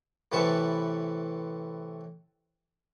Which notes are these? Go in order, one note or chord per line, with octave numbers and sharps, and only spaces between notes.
A2 C3 E3 B4 A5 C#6